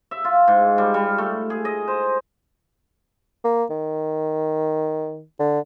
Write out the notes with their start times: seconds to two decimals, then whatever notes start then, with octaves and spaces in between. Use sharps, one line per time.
0.11 E5
0.25 F4
0.48 G#2
0.78 G3
0.94 G3
1.18 A3
1.50 G#4
1.65 D#5
1.88 C5
3.44 A#3
3.70 D#3
5.40 D3